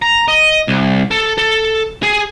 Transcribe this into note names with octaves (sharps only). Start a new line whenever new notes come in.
A#5
D#5
C2
A4
A4
G#4